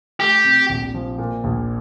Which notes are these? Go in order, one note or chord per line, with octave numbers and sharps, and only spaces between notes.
A3 G4
C3
A#1
F3
A#2
A#1